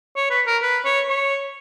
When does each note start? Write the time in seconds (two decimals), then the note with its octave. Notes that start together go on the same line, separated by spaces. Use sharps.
0.16 C#5
0.30 B4
0.47 A#4
0.62 B4
0.85 C#5
1.08 C#5